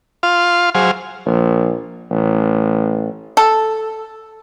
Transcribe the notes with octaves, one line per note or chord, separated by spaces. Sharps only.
F4 F5 C6
F#3 G#4 C5 F5
A#1
A1
A4